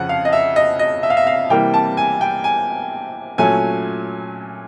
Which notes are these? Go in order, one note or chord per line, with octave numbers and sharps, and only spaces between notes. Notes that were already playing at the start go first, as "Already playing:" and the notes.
Already playing: F2 C#3 F3 F#5
F5
D#5
E5
D#5
D#5
E5
F5
E5
F5
C3 E3 G3 A#3 G5
A5
G#5
G5
G#5
A#2 F#3 A3 C#4 G#5